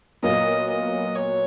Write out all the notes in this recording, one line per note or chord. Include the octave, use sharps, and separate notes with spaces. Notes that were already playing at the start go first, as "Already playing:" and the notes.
A#2 F#3 B3 F4 A#4 D#5
D#5
C#5